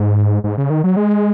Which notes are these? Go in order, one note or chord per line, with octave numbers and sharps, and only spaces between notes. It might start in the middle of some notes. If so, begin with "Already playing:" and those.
Already playing: G#2
G#2
C#3
D#3
F#3
G#3